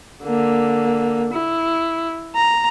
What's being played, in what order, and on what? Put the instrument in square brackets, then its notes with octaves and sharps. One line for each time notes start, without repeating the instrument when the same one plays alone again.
[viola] D3 A#3
E4
A#5